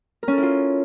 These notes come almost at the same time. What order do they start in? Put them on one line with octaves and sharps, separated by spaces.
A#4 C#4 A4 E4 F4